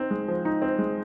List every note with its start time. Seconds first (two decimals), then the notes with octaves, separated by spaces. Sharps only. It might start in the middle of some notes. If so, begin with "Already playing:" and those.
Already playing: C4 D#4
0.11 G#3
0.28 F3
0.45 D#4
0.62 C4
0.78 G#3